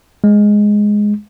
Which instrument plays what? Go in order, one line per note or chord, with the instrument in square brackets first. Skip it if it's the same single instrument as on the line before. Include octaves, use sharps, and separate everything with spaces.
[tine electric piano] G#3